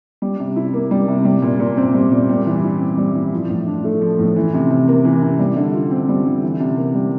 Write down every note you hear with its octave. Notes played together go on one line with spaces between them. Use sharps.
G3
C3
E4
A#3
G3
C3
G3
A#2
A#2
C4
G3
A#2
G3
E3
E4
C4
G3
E3
F3
A2
D4
A3
F3
A2
E3
C3
C3
A#3
E3
C3
G3
D3
F4
C4
G3
D3
E3
C3
A#3
G3